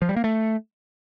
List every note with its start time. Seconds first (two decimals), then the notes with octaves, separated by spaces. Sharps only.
0.02 F3
0.09 G3
0.16 A#3
0.24 A3